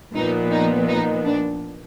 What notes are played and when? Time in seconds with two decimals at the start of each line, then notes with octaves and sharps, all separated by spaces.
0.14 A#2 F3 B3 D#4
0.51 D#4
0.88 D#4
1.25 D4